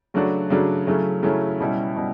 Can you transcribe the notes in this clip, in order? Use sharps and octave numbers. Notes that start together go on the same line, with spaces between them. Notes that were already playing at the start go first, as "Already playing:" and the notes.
C#3 F#3 A3 D4 F#4
C#3 F#3 A3 D4 F#4
C#3 F#3 A3 C#4 E4
C#3 F#3 A3 C#4 E4
B2 G3 C#4 E4
B2 G3